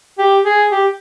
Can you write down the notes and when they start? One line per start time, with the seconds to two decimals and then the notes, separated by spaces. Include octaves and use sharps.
0.19 G4
0.45 G#4
0.72 G4